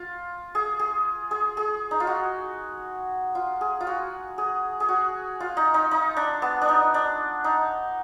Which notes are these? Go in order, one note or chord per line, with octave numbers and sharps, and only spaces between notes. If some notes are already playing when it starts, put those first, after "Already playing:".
Already playing: F4
G#4
G#4
G#4
G#4
D#4
F4
F#4
F4
G#4
F4
F#4
G#4
G#4
F#4
F4
D#4
D#4
D#4
D4
B3
D4
D#4
D4
D#4